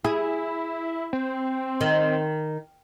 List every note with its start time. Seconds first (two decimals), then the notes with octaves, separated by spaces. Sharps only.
0.05 E4 G#4
1.13 C4
1.81 D#3